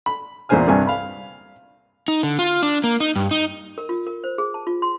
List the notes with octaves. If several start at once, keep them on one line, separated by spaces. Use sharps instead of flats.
B5
E2 A#2 C#3 C5 G#5 F6
C2 G2 G#5
F5 B5
D#4
D3
F4
D4
A#3
D#4
G2
D#4
A#4
F4
A#4
C5
G#4
A5
F4
C6